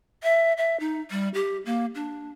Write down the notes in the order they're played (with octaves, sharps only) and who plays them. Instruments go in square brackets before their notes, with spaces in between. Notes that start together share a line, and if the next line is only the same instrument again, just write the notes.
[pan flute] E5
E5
D#4
G3
G4
A#3
D4